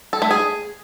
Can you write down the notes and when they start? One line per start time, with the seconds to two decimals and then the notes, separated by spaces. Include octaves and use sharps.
0.13 A4
0.22 A3
0.31 G#4